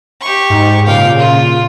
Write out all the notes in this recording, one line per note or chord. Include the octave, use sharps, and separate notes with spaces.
G4 C#6
G#2
A#2 C#3 F5 G5
F4